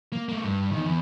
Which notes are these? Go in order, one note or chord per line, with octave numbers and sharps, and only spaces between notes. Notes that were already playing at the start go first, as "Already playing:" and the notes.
A#3
A3 A#3
G2
E2 D#3
E2